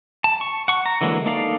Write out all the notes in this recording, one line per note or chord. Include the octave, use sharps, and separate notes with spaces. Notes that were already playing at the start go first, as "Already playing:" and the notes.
A5
C#6
F#5 C#6
A#5
D3 E3 F#3 G#3 A#3
A#3 D#4 A4 D5 F5